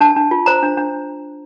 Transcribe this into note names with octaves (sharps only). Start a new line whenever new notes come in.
D4 A5
D4
F4
C5 A#5
D4
D4